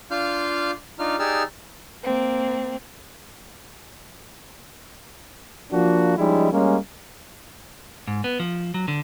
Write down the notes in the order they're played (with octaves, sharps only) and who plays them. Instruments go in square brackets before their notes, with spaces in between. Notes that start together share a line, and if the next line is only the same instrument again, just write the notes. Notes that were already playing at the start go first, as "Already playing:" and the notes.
[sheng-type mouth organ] D4 F4 F5 C6 F6 G6
D4 D#4 F4 F6
D#4 G4 G#4 D5 E6 F6
[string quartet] A#3 C4
[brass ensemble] F3 A#3 D4 F4 F#4
F3 G3 G#3 C#4 D#4 E4
G3 G#3 A#3 C#4
[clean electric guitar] G#2
B3
F3
F#3
D3